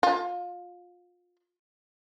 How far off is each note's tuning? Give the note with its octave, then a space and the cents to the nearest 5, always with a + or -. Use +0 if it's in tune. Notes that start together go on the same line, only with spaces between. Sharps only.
F4 +25